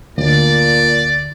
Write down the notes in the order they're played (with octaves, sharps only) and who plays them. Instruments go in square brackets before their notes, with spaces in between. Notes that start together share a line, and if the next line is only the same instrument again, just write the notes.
[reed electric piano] D2 [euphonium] A#2 [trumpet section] D5